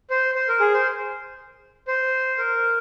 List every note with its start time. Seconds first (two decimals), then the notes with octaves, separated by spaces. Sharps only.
0.10 C5
0.35 C5
0.48 A#4
0.60 G#4
0.74 C5
1.88 C5
2.38 A#4